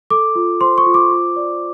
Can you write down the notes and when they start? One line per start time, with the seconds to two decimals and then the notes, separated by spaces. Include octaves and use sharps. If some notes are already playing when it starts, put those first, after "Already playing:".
0.10 A4 D6
0.35 F4
0.61 C5 C6
0.78 C#6
0.86 F4
0.94 D6
1.11 F4
1.36 D5